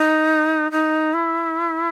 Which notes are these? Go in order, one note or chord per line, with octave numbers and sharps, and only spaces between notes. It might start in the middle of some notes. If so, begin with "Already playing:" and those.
Already playing: D#4
D#4
E4